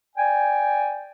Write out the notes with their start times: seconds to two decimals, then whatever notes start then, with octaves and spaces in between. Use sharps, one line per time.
0.16 D5 G5 G#5